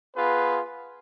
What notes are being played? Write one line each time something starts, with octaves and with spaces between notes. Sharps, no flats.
B3 F4 G#4 B4